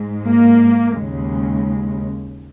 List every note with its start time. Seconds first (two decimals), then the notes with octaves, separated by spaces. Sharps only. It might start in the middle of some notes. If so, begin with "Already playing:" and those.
Already playing: G#2 G#3
0.26 A#3
0.93 D#2 C#3 G#3